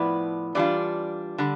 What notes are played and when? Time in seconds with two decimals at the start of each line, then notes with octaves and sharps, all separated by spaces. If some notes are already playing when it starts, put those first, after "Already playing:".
Already playing: A2 F3 B3 E4 D5
0.55 E3 G3 D4 F4 D5
1.38 D3 G3